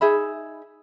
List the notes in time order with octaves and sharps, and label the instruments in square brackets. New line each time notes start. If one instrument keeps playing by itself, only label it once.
[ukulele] D#4 G#4 E5 B5